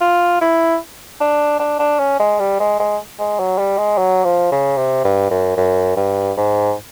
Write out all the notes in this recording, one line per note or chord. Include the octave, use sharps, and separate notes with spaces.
F4
E4
D4
D4
D4
C#4
G#3
G3
G#3
G#3
G#3
F#3
G3
G#3
F#3
F3
C#3
C3
G2
F#2
F#2
G2
G#2